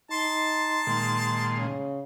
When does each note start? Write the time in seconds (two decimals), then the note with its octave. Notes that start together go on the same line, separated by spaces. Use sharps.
0.11 D#4 A5 C6
0.87 A#2 D#3 G#3
1.57 C#3